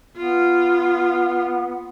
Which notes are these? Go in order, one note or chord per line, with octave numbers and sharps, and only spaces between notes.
B3 F4